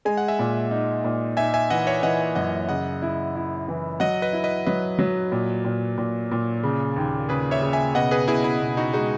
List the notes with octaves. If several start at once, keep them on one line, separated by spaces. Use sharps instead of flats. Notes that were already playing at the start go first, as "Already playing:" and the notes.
G#3 G#5
F#5
E5 G#5
A#2
D#4
A#2
D#4 E5 G#5
E5 G#5
E3 D#5 F#5
C#5 E5
E3 D#5 F#5
F#2 D#5 F#5
C#3 D#5 F#5
E4
E4
E3
F#3 D#5 F#5
B4 D#5
E4
B4 D#5
F#3 B4 D#5
F#3
A#2
A#2
A#2
A#2
C#3
D#2
C#3 G#4 B4
C#5 E5
C#3
E5 G#5
B2 D#5 F#5
G#4 B4
B2 E4 G#4
E4
B2
D#4 F#4
G#3 D#4 F#4